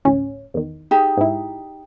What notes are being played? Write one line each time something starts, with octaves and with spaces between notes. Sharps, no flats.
A1 D2 C#4
E2 D#3
D#4 G4 G#4
G#2 E4